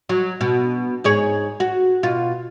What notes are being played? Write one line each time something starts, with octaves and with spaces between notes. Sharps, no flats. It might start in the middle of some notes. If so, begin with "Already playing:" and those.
F#3
B2
G#2 G#4 C#5
F#4
B2 F4